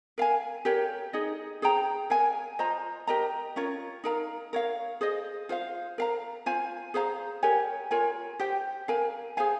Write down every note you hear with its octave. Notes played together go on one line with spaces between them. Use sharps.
A#4 F5 G#5
G4 A#4 C#5
D#4 G#4 D#5
G#4 C5 G5 A#5
A#4 C#5 F5 G#5
F4 C5 D#5 A#5
G4 A#4 D#5 A#5
C#4 F4 A#4 C#5
D#4 A#4 F5 A#5
A#4 C#5 F5
G#4 C5 D#5
F4 C5 F5
A#4 F5 A#5
F4 C5 F5 G#5
G#4 C5 F5 A#5
G4 A#4 C#5 G#5
F4 A#4 C#5 G#5
G4 C5 G5
A#4 F5 G#5
G#4 C5 F5 G#5